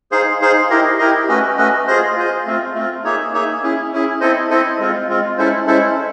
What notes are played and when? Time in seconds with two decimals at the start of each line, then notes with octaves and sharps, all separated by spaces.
0.12 D#4 G#4 C5 F5
0.41 D#4 G#4 C5 F5
0.70 E4 G4 A#4 D#5
0.99 E4 G4 A#4 D#5
1.28 A3 C#4 F#4 B4 D#5
1.57 A3 C#4 F#4 B4 D#5
1.88 F4 G#4 C5 D#5
2.17 F4 G#4 C5 D#5
2.46 A3 C4 F4
2.75 A3 C4 F4
3.04 A#3 D#4 G#4 C#5 E5
3.33 A#3 D#4 G#4 C#5 E5
3.63 C#4 E4 G#4
3.92 C#4 E4 G#4
4.21 C4 E4 A4 C5 D#5
4.50 C4 E4 A4 C5 D#5
4.79 G#3 C4 F4
5.08 G#3 C4 F4
5.38 G#3 C#4 E4 A4 C5
5.67 G#3 C#4 E4 A4 C5